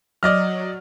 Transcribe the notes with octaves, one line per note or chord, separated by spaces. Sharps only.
F#3 D5 D#5 F6